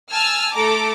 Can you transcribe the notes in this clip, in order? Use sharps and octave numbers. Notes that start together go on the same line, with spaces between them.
G#5 A5 E6 F6
A3 A4 A#5 D6